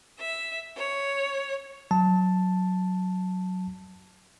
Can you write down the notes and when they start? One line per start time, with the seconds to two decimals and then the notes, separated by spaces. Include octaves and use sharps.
0.18 E5
0.76 C#5
1.91 F#3 A5